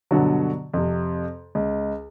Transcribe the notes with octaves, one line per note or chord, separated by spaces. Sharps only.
G2 B2 D3 F#3
F2 C3
C#2